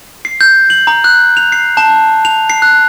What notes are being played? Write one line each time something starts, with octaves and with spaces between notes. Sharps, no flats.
C7
G6
F#7
A#5
F#6
F7
C7
A5
F7
C7
F#6